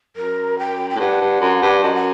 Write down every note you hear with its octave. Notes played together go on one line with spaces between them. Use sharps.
F#2 A#4
G5
G5
A2
G2 F#5
G2
F#2
G2
F#2 D#5
F#5